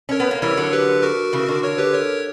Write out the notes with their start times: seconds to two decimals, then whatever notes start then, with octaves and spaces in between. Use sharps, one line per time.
0.09 C#4 A#4 C#5
0.20 B3
0.31 A#3
0.42 E3 G3 A#4 C#5
0.57 D3 F#3
0.73 G4 B4
1.02 F#4 A#4
1.33 C#3 E3
1.48 D3
1.63 A#4 C#5
1.78 G4 B4
1.94 A#4 C#5